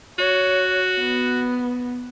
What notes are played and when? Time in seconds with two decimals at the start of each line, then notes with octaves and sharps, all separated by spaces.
0.19 F#4 C#5
1.00 B3